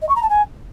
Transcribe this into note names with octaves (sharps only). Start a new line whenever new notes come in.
D#5
C#6
A#5
A5
G#5